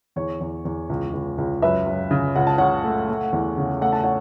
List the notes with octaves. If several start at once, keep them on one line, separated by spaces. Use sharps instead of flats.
E2 C#5
E2
E2
C#2
C#2
C#2
F#2 B4 E5
F#2
C#3
C#2 F#5
A5
C#2 C#5 F#5
A3
A3
E2
C#3
A3 F#5
A5
C#5 F#5